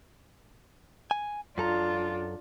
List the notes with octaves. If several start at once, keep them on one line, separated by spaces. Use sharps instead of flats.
G#5
F#2 D4 F4 A4 A#5